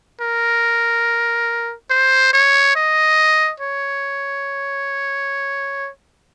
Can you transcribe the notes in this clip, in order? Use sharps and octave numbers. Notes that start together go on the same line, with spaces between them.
A#4
C5
C#5
D#5
C#5